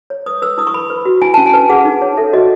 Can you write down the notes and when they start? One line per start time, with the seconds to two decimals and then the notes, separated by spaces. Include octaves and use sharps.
0.10 C#5
0.26 B4 D#6
0.42 B4 E6
0.58 E4 D#6
0.67 C#6
0.74 B4 B5
0.90 B4
1.05 F#4
1.22 E4 G#5
1.34 C#4 A5
1.46 G#5
1.54 B4
1.69 G#4 F#5
1.85 D#4
2.02 C#5
2.17 A4 E5
2.33 F#4 D#5